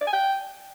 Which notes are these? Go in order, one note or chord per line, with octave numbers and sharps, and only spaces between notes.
D5
G#5
G5